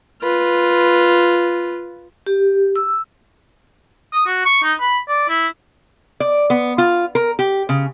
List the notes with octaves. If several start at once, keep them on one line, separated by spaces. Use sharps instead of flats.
F4 B4
G4
E6
D#6
F#4
C#6
D#4
B5
D5
E4
D5
B3
F4
A#4
G4
C#3